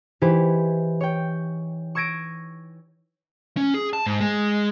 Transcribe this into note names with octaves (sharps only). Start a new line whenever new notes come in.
E3 D#4 E4 G4 B4 C5
C#5 G5
C#6 E6 G#6 A#6 D7 D#7
C#4
G#4
A5
G#2
G#3